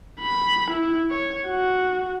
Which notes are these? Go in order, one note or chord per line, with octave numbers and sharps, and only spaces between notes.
B5
E4
C#5
F#4